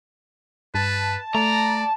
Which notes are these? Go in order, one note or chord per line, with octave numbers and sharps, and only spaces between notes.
G2 B4 A5
A3 D5 A#5